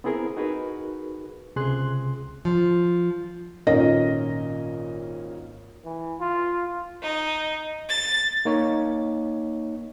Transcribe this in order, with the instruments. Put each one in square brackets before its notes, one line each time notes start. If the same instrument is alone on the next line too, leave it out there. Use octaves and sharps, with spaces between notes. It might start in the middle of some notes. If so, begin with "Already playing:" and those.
[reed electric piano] B3 C4 E4 G#4 A#4
D#4 F#4 G#4 A#4 B4
C#2 C3 G#4 C6 F#6
[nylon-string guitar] F3
[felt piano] G#1 A#2 C#4 A#4 D#5 A#6
[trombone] E3
F4
[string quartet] D#4
A6
[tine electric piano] A#3 D#4 C#5